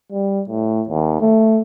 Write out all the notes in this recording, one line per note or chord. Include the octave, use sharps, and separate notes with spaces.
G3
A2
D#2
A3